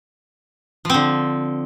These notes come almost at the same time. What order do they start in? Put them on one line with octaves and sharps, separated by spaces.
F3 C4 D3